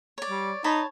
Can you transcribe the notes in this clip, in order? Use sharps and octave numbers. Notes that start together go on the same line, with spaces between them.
C#5 D5
G3
D#4 C#5 A5 B5